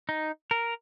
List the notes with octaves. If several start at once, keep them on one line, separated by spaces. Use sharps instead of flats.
D#4
A#4